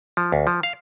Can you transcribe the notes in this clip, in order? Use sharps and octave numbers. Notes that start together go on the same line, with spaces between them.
F3
D2
F3
F5